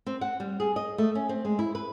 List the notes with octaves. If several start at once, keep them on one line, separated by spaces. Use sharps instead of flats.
C4
F#5
G3
G#4
D#5
A3
C#4
C4
G#3
E4
B4